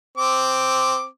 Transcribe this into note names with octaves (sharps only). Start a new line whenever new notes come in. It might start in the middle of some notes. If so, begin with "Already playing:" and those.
C4 D6